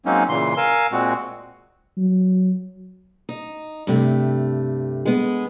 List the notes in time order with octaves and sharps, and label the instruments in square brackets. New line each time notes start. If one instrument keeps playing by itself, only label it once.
[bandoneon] F#3 G#3 A#3 C4 C#4 D#4
A#2 C#3 E3 C6
A#4 F5 G#5 E6
A#2 G#3 C4 F#4
[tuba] F#3
[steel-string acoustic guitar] D#4
G2 C3 A3
G#3 B3